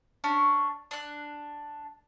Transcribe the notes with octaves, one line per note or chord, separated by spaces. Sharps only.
C#4 D4 C#6
D4 F#6